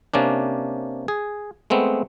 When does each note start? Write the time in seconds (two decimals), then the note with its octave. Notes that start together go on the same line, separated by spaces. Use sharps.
0.14 C3 A#3 C#4 D4
1.08 G#4
1.70 G#3 A3 B3 C4